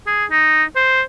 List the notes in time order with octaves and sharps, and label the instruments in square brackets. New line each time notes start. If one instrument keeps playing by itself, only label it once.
[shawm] G#4
D#4
C5